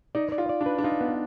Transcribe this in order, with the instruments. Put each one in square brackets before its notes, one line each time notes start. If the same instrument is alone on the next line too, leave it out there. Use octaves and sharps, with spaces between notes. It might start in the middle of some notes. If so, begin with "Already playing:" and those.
[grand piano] D#4 [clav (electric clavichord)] D5
[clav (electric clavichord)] D5
[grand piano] F4
[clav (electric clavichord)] D5
[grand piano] D4
[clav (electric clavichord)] B4
[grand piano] D4
[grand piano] D#4 [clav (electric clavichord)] F4
[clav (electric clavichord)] B3